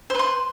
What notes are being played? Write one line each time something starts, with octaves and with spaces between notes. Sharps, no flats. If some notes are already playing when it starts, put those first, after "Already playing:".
B4 C5 C6